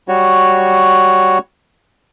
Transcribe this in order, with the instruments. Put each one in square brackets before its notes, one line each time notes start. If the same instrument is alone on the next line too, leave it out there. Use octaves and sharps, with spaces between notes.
[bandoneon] G3 F#4 C#5